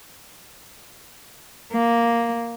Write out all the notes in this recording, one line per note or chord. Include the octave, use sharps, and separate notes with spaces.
A#3